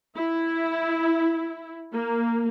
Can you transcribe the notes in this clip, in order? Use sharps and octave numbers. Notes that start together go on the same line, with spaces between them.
E4
A#3